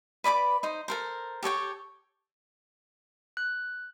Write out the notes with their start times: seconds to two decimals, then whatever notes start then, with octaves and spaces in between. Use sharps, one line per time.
0.24 B4 D5 B5 D6
0.63 D#4 C5
0.88 A4 A#4 C5
1.43 G4 A4 C#5 G5
3.37 F#6